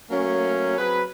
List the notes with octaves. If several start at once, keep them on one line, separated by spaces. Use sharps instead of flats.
F#3 A3 A#3 C#4
F#3 C4 G#4 B4